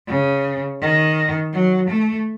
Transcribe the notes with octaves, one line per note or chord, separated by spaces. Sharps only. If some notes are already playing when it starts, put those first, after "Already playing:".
C#3
D#3
F#3
A3